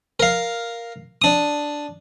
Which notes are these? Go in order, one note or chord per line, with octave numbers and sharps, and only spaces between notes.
A#4 F5
D4 D#6